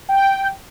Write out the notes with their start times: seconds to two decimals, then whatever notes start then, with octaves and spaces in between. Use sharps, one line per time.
0.09 G5